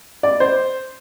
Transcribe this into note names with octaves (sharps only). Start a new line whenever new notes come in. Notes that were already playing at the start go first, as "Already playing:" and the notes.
D5
C5